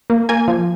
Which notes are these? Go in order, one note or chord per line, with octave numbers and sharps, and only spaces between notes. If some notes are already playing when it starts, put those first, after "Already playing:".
A#3
A#3 G#5
F3